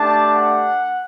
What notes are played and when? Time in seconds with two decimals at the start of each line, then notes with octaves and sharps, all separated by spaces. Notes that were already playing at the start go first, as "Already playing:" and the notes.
Already playing: A3 D4 G4 A5
0.34 F#5